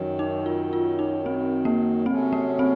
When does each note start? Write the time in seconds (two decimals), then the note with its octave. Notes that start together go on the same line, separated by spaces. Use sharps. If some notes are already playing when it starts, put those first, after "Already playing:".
Already playing: F#2 D#3 F#3
0.19 D#4
0.46 F4
0.73 F4
0.99 D#4
1.26 C4
1.65 A#3
2.06 C3 F#3 A3 C4 C#4
2.33 A#3
2.59 C4